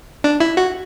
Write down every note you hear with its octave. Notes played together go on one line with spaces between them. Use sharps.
D4
E4
F#4